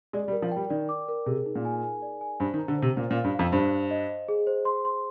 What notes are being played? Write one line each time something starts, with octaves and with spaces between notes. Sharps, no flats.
G#3 D5
G3
A#4
F3
G3 G5
D#3 D5
D6
A#4
C3 G#4
D#4
A#2
G#5
G#5
D5
G#5
G2 C5
D#3
A#5
D3
C3 C5
A#2 C5
A#2
F5
G2
F2 F5
G2 C5
C5
D#5
D#5
G#4
C5
C6
C6